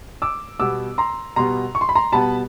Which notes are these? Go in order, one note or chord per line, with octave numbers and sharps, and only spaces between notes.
D6 E6
B2 G3 B3 D6 E6
A#5 C6
B2 G3 B3 A#5 C6
C#6
C6
B5
A#5 C6
B2 G3 B3 A5 B5